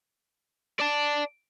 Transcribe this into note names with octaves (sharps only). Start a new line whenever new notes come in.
D5 A5